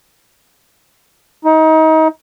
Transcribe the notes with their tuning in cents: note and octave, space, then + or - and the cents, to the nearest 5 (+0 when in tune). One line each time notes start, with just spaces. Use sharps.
D#4 +30